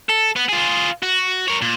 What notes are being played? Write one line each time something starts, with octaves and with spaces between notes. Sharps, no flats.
A4
B3
F4 G#4
F#4
A#4 C#5
A#2